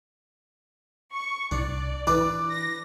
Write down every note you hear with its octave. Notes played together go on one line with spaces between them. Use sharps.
C#6
C2 D4 D5
E3 D4 B4 D6
A#6